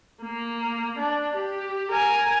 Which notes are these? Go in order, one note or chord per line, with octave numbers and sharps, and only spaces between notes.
A#3
D4
G4
A#4 G#5